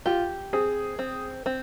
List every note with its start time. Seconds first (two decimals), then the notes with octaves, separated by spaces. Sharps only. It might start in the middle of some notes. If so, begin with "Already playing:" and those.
0.06 F4 G4
0.53 C4 G#4
0.99 C4
1.46 C4